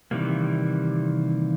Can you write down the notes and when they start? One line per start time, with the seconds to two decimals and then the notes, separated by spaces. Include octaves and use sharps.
0.11 C3 D#3 E3 G3 A#3